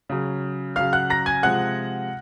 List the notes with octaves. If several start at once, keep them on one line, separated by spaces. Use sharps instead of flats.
C#3 F#3
C#3 F#3 F5 F6
F#5 F#6
A#5 A#6
G#5 G#6
C3 F3 G#3 F#5 F#6